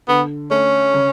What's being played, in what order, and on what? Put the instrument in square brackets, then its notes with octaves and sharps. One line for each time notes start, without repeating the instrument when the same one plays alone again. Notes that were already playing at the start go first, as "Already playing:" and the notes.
[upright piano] D3 [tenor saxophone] B3
[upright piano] A3 [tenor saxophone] C#4
[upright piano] C#3